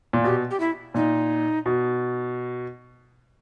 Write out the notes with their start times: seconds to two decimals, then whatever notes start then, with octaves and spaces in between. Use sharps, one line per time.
0.13 A#2
0.24 B2 G4
0.51 G4
0.60 E4
0.94 A#2 D#4
1.66 B2